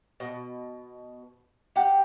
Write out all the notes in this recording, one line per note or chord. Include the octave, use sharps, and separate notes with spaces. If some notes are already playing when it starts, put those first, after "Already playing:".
B2
G4 F#5 G5